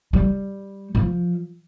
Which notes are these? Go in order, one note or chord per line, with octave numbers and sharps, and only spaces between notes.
G3
F3